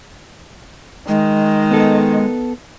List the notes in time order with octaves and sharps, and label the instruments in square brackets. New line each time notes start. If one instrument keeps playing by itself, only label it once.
[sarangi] D#3 [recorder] G#3
[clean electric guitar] B3 A4